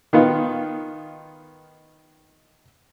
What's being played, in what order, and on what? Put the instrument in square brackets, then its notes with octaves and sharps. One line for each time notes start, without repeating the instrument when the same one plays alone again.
[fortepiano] D#3 B3 F4